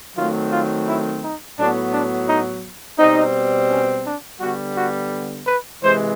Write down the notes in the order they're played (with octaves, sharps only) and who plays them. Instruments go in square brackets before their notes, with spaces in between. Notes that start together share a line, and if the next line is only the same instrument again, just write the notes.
[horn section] D#3 F#3 A3 C4 F4
F4
E4
D#4
A2 F#3 B3 D4
D4
D#4
B2 G3 C4 D#4
C#4
D4
D3 G3 B3 F#4
F#4
B4
C3 E3 G#3 C5